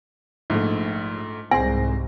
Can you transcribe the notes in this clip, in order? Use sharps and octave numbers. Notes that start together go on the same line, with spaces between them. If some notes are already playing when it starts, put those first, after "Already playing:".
A#1 G#2 A3
C2 G#2 C4 G#4 G#5 C6 A#6